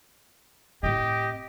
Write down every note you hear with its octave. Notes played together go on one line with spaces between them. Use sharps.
A2 C4 G4 D#5